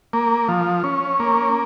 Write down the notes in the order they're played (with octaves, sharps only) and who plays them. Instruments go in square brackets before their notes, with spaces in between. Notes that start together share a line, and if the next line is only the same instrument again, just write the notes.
[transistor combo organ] A#3
F3
C#4
A#3